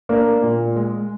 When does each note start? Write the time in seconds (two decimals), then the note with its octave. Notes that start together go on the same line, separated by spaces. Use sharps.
0.09 A#3 D4
0.42 A#2
0.76 G#3